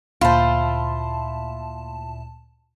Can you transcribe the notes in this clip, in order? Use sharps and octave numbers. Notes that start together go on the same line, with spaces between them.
D2 A#2 E4 F4 C5 A5